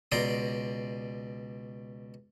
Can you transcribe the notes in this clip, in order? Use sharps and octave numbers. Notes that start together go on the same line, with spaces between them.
C#2 B2 D5 A#5 C6 D#6